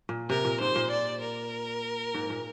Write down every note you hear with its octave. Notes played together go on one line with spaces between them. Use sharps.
A#2
C3 A#4
A#2
G#2 C5
A#2
D5
A#4
G#2
A#2